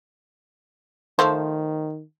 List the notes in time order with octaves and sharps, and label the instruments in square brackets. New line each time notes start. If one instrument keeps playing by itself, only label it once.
[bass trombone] D#3 [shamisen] F3 A3 C5